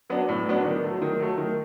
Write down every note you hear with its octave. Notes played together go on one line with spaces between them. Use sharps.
F#3 B3 D4
A2
F#3 B3 D4
D#3
F#3 A3
D#3
F#3 A3
D#3